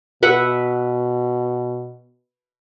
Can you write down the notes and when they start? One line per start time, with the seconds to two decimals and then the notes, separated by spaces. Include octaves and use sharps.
0.23 B2 B4 E5 F#5